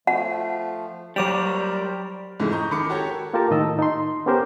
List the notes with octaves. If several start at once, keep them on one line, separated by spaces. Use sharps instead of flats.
F3 A3 F#5
F#3 G3 A#4 C5 C#5 D6 D7
F2 G#2 C#3 E3 G#3 A3
D#5 A#5 C#6 G6
A1 D#3 B5 D6 C#7
F#4 G4 A4 A#4 C#5
A#3 F4 G4 A4 A#4 A5
A2 D#3 D#5 A5 E6
D#4 C6
B3 C#4 G4 A#4 C5